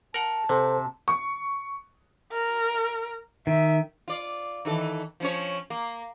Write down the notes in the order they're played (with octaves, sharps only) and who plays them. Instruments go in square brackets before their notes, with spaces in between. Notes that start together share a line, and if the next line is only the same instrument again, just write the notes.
[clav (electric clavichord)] A#4 F#5 [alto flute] A5
[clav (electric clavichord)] C3 [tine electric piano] A4 C5
[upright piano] C#6
[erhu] A#4
[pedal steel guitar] D#3 [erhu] E5
[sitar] F4 D5
D#3 E3 A4
F3 C#4 C#5
A#3